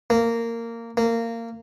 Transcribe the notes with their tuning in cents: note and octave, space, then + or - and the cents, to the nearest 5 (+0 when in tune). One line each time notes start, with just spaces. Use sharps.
A#3 -15
A#3 -20